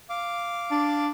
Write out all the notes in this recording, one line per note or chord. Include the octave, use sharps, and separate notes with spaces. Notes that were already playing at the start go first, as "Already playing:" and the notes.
F5 D6
D4